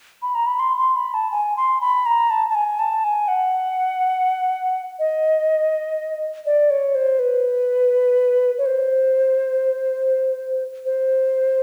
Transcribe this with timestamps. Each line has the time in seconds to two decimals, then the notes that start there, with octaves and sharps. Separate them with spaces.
0.22 B5
0.35 A#5
0.46 B5
0.59 C6
0.78 C6
0.96 B5
1.14 A5
1.32 G#5
1.57 C6
1.81 B5
2.06 A#5
2.30 A5
2.50 A5
2.55 G#5
2.79 A5
3.04 G#5
3.28 F#5
4.99 D#5
6.46 D5
6.70 C#5
6.95 C5
7.19 B4
8.58 C#5
8.66 C5
10.85 C5